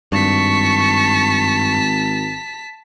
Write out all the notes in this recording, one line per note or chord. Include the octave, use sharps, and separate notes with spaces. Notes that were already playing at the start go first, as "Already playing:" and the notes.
G#1 G2 A5 C#6 B6